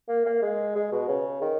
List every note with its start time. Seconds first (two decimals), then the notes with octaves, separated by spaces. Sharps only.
0.09 A#3
0.26 A#3
0.42 G#3
0.75 G#3
0.92 B2
1.08 C#3
1.41 D#3